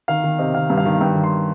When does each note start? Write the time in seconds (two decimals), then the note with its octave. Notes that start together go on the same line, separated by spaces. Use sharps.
0.08 D#3 F5
0.24 D#3
0.39 C3 D#5
0.54 D#3 F5
0.70 G2
0.77 F5
0.85 D#3
1.01 G2 G5
1.15 D#3
1.24 C6